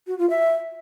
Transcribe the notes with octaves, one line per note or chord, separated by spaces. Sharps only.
F#4
F4
E5